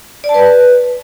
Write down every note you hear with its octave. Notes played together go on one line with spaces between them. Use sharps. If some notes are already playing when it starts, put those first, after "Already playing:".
D5
A5
B4